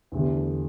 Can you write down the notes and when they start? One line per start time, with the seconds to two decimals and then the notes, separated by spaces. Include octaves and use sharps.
0.12 E2 D3 A3 G4